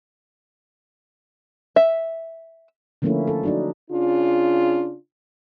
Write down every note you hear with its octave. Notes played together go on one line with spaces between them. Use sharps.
E5
D3 F3 A3 A#3 C#4 E4
A4
F#3 D4 D#4
C#3 D4 F4